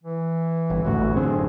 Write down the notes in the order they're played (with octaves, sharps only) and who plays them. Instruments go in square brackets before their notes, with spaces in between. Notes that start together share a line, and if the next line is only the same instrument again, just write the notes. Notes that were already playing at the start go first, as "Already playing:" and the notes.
[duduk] E3
[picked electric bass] G1
[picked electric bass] A1 D2 A2 [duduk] F#4
[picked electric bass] F#2 D3 C4 [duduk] G#4